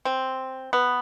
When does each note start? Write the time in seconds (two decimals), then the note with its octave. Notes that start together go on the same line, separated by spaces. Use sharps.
0.05 C4
0.73 B3